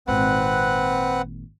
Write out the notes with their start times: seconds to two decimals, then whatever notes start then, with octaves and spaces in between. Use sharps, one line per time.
0.07 G#1 A#2 C4 B4 F#5